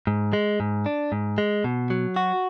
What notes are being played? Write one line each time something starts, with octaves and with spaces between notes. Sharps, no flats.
G#2
G#3
G#2
D4
G#2
G#3
B2
F#3
F#4